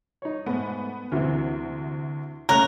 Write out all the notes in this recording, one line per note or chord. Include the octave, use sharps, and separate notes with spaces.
D#4 C#5
G#2 A3 B3
D2 C3 E3 A#3
C#3 A3 A#3 A#4 C#5 F#6 F7